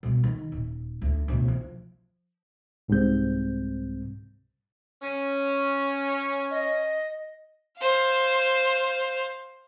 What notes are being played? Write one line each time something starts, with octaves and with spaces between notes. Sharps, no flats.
B2 G3
D#3
D#1
D2
D2 B2
F3
C2 G#2 G3 C4 G6
C#4
D#5
C5 F5